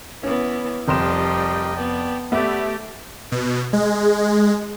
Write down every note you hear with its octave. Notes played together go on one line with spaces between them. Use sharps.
E3 B3 C#4
F1 F3 G3 A#4 D#5 G5 C6 E7
B3 D5 G5 A5
A3 B3 G4 D5 E5
B2
G#3